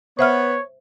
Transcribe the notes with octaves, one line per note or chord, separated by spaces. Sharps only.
B3 C5 C#5 E5 F6